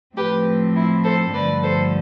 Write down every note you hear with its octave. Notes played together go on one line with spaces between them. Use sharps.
A2 F3 A3 C4 G4 B4
E4
A4 C5
G2 D3 F3 A3 B4 D5
A4 C5